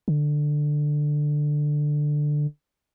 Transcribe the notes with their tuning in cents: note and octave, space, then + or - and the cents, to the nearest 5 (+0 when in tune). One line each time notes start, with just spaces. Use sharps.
D3 +10